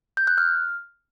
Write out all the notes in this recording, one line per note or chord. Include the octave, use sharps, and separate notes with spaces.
G6
F#6
F6